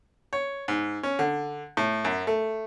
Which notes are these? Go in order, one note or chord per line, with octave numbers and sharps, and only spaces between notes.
C#5
G#2
C#4
D3
A2
F#2
A3